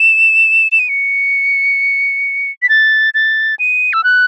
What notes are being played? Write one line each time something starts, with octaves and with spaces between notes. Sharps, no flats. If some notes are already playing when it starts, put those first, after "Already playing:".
Already playing: E7
E7
D#7
C#7
B6
A6
A6
D#7
E6
F#6